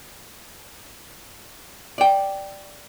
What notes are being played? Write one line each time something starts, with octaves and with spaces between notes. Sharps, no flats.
D5 G5